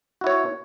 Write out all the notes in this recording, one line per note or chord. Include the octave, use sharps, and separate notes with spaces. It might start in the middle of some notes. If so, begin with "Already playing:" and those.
E4 F#4 C#5